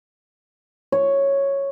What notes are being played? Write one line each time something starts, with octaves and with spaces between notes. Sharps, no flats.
C#5